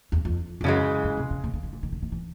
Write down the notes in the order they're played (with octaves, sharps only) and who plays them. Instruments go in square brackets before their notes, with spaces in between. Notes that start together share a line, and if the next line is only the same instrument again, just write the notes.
[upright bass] E2
F2
F2
[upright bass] F#2 [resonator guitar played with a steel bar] C#3 E3 G#3
[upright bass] G2
C3
C#3
C#3
D3
D#3
E3
D#3
D3
D#3
E3